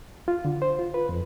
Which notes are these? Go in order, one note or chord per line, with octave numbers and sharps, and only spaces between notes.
F4
D3
C5
F4
B4
F2